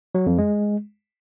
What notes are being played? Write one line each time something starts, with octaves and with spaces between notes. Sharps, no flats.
F#3
F2
G#3